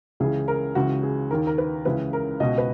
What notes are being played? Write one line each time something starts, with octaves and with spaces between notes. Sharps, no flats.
C#2 C#3 E3 G#4
A#4
C#2 C#3 E3 F#4
G#4
D#2 D#3 A#4
A#4
B4
C#2 C#3 E3 B4
A#4
C#2 B2 D#5
B4